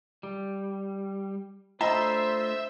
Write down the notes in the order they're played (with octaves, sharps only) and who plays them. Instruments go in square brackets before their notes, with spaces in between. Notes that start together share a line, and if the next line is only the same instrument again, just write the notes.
[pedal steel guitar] G3
[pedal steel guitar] A3 D4 F4 [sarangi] C5 [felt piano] D#5 A#5 B5 [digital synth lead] E5